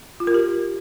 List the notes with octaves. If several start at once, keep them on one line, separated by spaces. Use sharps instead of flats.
F4
A#4
G4